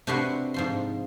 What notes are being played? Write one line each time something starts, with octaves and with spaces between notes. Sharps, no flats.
C3 D4 F#4 B4 F#5 C6
G#2 F3 C6